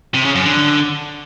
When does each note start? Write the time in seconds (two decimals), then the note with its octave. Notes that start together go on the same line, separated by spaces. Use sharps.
0.14 C3
0.25 C#3
0.35 F#2
0.45 D3